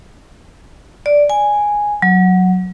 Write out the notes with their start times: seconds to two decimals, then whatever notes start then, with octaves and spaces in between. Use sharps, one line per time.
1.06 D5
1.30 G#5
2.02 F#3